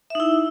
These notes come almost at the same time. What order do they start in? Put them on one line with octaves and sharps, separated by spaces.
E5 D#4 E4